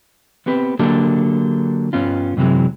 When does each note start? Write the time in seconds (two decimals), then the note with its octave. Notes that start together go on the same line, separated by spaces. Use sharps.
0.46 B3 C4 G4 B4
0.79 D3 F#3 A#3 D4 G4 A4
1.93 G2 B3 C#4 F4
2.37 F#2 C3 E3 F#3 G#3